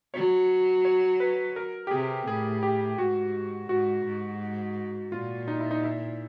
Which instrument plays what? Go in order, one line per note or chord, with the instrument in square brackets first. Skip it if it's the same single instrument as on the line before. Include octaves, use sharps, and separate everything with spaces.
[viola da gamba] F#3 [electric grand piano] C#5
[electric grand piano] C#5
B4
A#4
G4
[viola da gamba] C3 [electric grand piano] G#4
[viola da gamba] A2 [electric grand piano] G#4
[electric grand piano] G4
[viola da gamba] G#2 [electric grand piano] F#4
[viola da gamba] G#2 [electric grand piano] F#4
[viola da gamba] G#2
[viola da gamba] A#2 [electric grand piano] F4
[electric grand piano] D#4
E4
D#4
E4